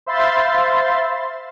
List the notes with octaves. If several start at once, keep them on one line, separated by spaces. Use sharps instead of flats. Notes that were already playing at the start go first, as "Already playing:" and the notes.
C5 E5 F5 B5 C6 A6